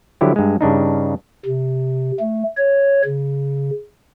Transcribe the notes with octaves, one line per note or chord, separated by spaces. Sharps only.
D3 F3 F#3 E4 G4
G2 G#3
G2 C#3 D4 D#4
C3
A3
C#5
C#3